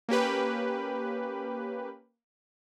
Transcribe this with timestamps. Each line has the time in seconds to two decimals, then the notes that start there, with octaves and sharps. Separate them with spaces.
0.09 A#3 C#4 G4 B4